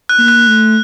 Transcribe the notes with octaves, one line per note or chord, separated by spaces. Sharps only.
F#6
A#3
F#6
A3